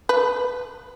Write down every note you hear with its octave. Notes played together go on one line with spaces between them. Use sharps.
B4